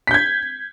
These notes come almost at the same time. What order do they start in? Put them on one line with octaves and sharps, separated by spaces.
B6 G6 G#6